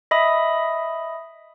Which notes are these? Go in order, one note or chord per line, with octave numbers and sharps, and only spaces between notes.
D#5 E5 B5 D#6